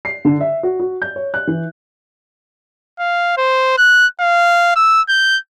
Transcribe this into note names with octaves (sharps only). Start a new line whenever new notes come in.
C7
D3
E5
F#4
F#4
G6
C#5
F#6
E3
F5
C5
F#6
F5
E6
G6